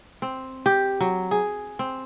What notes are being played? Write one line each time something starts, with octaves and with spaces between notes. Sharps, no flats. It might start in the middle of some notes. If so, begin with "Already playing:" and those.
C4
G4
F#3
G#4
C4